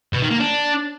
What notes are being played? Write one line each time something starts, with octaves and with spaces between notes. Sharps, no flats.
B2
D#3
A#3
D4